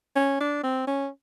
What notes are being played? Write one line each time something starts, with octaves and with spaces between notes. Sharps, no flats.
C#4
D4
C4
C#4